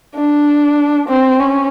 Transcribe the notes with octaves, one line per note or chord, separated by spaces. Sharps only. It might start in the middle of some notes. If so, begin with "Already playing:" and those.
D4
C4
C#4